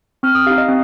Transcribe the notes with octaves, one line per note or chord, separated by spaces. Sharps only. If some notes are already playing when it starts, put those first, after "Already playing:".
C4 F6
D#6
D#4 G4 F5
D#5
C4